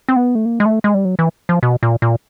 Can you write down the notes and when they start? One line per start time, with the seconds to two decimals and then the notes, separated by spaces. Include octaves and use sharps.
0.09 C4
0.16 B3
0.35 A3
0.45 A#3
0.60 G#3
0.66 A3
0.84 G#3
0.94 G3
1.05 F#3
1.19 E3
1.49 F3
1.63 B2
1.83 A#2
2.02 A#2